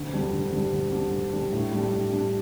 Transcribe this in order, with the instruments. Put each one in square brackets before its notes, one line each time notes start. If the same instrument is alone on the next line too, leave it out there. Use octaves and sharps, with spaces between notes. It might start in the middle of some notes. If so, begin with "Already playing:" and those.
Already playing: [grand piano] D2
D3 G3 D4
D2
D3 G3 D4
D2
D3 G3 D4
D2
D3 G3 D4
A2
G3 D4
A2
G3 D4